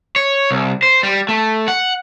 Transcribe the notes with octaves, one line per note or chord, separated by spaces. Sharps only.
C#5
C2
C5
G3
A3
F#5